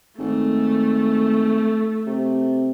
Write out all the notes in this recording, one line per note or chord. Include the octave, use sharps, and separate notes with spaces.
G#1 A3
C3